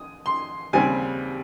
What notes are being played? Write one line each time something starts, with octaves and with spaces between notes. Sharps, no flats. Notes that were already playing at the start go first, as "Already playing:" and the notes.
Already playing: D#6
C6
D#2 C#3 G3 C4 G#5